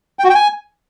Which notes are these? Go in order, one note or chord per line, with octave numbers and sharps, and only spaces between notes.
G5
F#4
G5
G#5